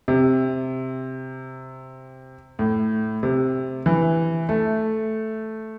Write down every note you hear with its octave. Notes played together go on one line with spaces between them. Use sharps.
C3
A2
C3
E3
A3